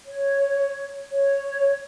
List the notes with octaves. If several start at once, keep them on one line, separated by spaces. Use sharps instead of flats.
C#5
C#5